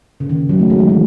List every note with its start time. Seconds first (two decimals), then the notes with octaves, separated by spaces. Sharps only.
0.20 C#3
0.29 D#3
0.49 F#3
0.60 A3
0.70 G#3
0.79 F#3
0.89 E3